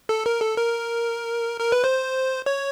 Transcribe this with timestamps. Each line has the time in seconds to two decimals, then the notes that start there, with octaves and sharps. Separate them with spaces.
0.09 A4
0.26 A#4
0.41 A4
0.57 A#4
1.60 A#4
1.72 B4
1.84 C5
2.46 C#5